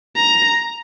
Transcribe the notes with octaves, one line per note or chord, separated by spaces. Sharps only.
A#5